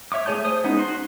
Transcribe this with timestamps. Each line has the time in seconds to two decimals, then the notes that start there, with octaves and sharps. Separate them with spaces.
0.12 C#5 E5 C#6 D6
0.26 A3 G#4 C#5 A5 G6
0.45 C5 D#6
0.64 G#3 B3 C#4 D#4
0.77 F#4 C6